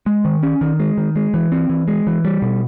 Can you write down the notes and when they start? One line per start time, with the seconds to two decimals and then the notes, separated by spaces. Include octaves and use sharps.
0.06 G#3
0.25 D#3
0.43 C#4
0.61 D#3
0.80 G#3
0.98 D#3
1.16 G#3
1.34 E3
1.52 C4
1.69 E3
1.88 G#3
2.07 E3
2.25 G3
2.42 B2